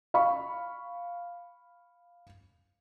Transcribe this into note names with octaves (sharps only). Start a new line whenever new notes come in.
F5 B5 C#6